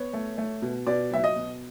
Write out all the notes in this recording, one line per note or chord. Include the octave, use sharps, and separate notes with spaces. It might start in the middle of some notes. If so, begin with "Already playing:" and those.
Already playing: B3 C#5
A3
A3
B2
B2 D5
F#3 E5
D#5
B2